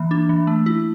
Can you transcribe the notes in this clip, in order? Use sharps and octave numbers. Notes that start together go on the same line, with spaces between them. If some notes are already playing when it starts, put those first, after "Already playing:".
Already playing: E3 A#3
D4
E3
A3
E4